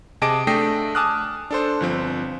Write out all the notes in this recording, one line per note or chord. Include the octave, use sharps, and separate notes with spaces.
C3 G#4 D#5 A5 D6 D7
A3 D4 G5 D#6 A#6 C7
G#5 A5 D6 D#6 F6 F#6
D4 A4 C5
G1 F3 C4